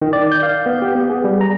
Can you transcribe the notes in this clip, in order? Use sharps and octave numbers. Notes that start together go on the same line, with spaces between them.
D#3
D5
G6
F5
B3
G4
B3
G#4
G3
A#5